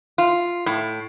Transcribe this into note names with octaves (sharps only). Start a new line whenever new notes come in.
F4
A2